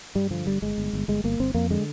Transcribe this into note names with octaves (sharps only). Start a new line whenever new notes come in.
G2 G3
D3 F3
G1 G3
G1 G#3
G1
G1
G1 G#3
G1 A#3
G1 C4
F2 A#3
D3 G#3